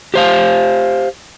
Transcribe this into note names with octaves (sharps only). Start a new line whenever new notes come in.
G4 C5 F5